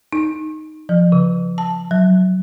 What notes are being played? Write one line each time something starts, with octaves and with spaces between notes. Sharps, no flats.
D#4
F3
C#3
A5
F#3